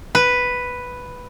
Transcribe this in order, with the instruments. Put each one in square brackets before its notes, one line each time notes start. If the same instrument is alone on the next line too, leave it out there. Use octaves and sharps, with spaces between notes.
[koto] B4